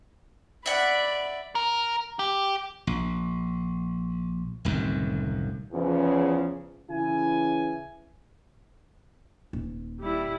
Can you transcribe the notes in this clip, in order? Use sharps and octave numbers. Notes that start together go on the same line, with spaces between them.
D5 E5 F#5 B5
A#4
G4
A#1
D1 C2 F#2 D#3
E2 C#3 F3
C#3 E3 E4 G#5
D#1
G3 E4